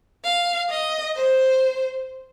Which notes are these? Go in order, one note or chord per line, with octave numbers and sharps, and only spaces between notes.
F5
D#5
C5